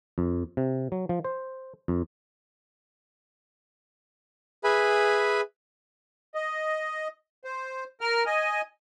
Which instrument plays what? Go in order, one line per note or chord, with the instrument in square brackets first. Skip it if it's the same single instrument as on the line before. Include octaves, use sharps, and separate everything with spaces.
[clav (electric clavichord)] F2
C3
F#3
F3
C5
F2
[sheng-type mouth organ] G#4 B4 E5 G#5 B5
[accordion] D#5
C5
A#4 F6
D#5 G#5